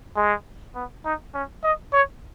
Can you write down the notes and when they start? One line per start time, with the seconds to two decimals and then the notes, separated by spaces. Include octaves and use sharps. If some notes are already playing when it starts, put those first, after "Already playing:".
0.16 G#3
0.75 B3
1.05 D#4
1.34 C#4
1.63 D#5
1.93 C#5